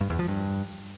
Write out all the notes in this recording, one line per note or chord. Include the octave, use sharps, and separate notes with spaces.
G2
E2
F3
G2